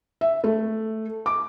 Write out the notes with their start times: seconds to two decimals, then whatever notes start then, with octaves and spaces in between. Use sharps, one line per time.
0.21 E5
0.44 A3
1.26 D6